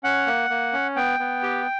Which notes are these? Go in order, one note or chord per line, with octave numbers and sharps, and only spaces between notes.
C#4 F#5
A#3
A#3
C#4
B3 G5
B3
G4